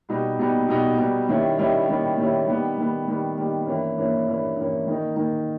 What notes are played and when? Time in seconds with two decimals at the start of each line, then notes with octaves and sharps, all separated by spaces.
0.09 B2 G3 B3 D#4
0.38 B2 G3 B3 D#4
0.68 B2 G3 B3 D#4
0.98 B2 G3 B3 D#4
1.28 D#3 G3 C#4 E4
1.58 D#3 G3 C#4 E4
1.88 D#3 G3 C#4 E4
2.18 D#3 G3 C#4 E4
2.47 D#3 G3 B3
2.78 D#3 G3 B3
3.08 D#3 G3 B3
3.38 D#3 G3 B3
3.67 G2 E3 A#3 C#4
3.97 G2 E3 A#3 C#4
4.27 G2 E3 A#3 C#4
4.56 G2 E3 A#3 C#4
4.87 D#3 A#3 D#4
5.16 D#3 A#3 D#4